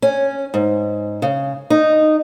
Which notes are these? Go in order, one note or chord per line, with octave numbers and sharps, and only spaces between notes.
C#4
G#2
C#3
D#4